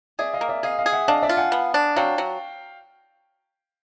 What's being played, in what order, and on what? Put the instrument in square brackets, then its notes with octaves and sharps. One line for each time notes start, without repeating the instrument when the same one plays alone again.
[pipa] G#4 [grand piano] D5 E5
[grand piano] D#5 F5
[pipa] A#3
[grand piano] D5 E5
[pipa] G#4 [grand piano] D#5 F5
[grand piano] D#5 F5
[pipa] G#4
[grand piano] E5 F#5
[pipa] D4 [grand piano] D#5 F5
[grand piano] D5 E5
[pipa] F4
[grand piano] F#5 G#5
[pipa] B3
D4
[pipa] F#3 [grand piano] F5 G5
[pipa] F#3